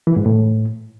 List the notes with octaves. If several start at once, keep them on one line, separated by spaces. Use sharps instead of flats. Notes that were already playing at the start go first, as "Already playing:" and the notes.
E3
G#2
A2